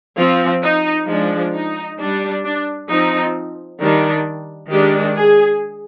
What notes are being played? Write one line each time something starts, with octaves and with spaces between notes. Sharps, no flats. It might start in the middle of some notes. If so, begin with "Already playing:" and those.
F3 C4 F4
D#4
F3 G#3 D4
D#4
G3 D4
D4
F3 C4 D#4
D#3 G3 D4
D#3 G#3 D4 G4
G#4